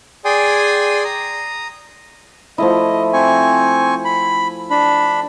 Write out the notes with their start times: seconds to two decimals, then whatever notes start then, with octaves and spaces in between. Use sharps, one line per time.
0.25 G#4 D5 G5 G#5 C6 D#6
1.04 A#5 D#6
2.58 F3 A3 E4 D#5
3.13 C4 G#5 C#6
4.05 B5
4.70 D4 B5